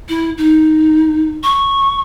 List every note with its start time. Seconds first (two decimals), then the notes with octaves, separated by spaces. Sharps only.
0.09 E4
0.38 D#4
1.43 C#6